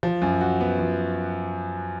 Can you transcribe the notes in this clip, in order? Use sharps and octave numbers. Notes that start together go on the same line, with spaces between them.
F3
F#2
F#4
B3
F3